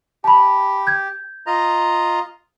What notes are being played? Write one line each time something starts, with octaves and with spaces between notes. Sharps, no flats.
G4 A5 B5
G6 G#6
F4 D#5 A#5